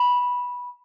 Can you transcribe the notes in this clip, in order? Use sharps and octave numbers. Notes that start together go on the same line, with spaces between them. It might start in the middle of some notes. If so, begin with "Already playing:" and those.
Already playing: B5